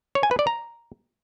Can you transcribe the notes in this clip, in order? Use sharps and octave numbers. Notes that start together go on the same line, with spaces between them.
C#5
G#5
B4
D5
A#5